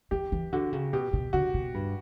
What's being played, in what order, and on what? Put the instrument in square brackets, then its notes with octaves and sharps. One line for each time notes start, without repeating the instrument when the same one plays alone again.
[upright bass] E3 [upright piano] G4
[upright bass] E3
[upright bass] D3 [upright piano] F#4
[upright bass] C#3
[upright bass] B2 [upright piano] G4
[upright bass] B2
[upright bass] D3 [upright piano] F#4
[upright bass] B2
G2